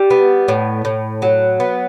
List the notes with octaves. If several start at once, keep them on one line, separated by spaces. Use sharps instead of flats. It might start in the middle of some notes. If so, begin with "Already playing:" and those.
Already playing: G3
B3
A2
A2
F#3
B3